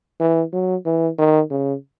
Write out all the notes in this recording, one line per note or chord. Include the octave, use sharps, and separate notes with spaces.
E3
F#3
E3
D#3
C#3